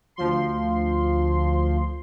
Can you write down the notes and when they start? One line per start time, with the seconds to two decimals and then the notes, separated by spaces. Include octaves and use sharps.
0.16 D2 F3 C6